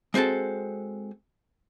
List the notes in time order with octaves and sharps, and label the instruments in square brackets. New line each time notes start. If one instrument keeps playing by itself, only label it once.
[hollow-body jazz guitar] G#3 C4 F#4 A4 A5